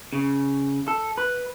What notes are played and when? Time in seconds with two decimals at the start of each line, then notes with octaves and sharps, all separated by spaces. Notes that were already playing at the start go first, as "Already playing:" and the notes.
0.13 C#3
0.88 A4
1.18 B4